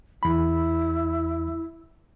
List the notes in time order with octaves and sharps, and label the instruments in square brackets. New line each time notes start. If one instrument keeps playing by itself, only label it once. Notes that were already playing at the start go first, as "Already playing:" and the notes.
[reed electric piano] E2 B5 [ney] E4